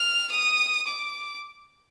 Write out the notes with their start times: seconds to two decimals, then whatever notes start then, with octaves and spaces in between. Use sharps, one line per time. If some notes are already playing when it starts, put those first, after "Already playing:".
Already playing: F6
0.32 D#6
0.87 D6